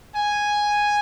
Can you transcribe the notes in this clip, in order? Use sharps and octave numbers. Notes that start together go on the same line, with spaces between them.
G#5